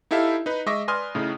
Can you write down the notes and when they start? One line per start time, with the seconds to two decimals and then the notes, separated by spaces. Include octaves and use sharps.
0.11 D#4 E4 G4 A4 E5 F5
0.46 D#4 B4
0.66 G#3 D#5 E5 C#6 D6 A#6
0.88 B4 D5 G#5 C6 D#6 F6
1.15 A2 C#3 C#4 D#4